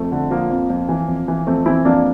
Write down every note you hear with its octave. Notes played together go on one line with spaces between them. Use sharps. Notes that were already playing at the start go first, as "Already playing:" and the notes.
Already playing: F2 A3
D3
F3 A#3
F2
F2
E3
F2
E3
F2 A3 C4
E3 C4 E4
F2 A#3 D4